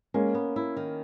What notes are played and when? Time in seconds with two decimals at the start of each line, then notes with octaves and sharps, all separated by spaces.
0.14 G#3 A#3 C#4
0.34 B3
0.56 E4
0.77 D#3